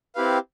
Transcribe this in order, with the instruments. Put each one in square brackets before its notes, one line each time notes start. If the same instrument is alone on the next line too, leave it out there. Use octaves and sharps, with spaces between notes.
[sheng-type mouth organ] C4 E4 G4 B4 F5